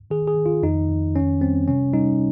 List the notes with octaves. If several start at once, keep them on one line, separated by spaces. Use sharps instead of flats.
D#3 G#4
G#4
D#3
F4
F2 D#4
F2
D#3 C#4
G3 C4
C3 C#4
G3 D#4